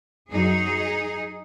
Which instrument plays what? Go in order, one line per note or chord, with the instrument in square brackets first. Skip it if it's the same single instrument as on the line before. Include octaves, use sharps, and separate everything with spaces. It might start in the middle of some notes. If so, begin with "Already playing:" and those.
[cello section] F#2 F#3 D#4 G#4